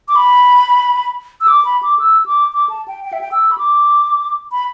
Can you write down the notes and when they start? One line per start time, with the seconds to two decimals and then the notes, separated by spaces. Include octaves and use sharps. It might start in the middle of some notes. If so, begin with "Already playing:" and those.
0.08 D6
0.16 B5
1.41 E6
1.48 D6
1.65 B5
1.83 D6
1.99 E6
2.26 D6
2.53 D6
2.69 A5
2.88 G5
3.05 G5
3.13 E5
3.21 G5
3.32 E6
3.51 B5
3.58 D6
4.52 B5